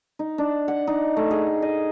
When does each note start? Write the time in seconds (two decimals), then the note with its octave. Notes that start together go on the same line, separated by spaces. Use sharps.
0.19 D#4
0.38 D4
0.68 F#5
0.87 D#4
1.17 A3
1.31 G#4
1.62 D#5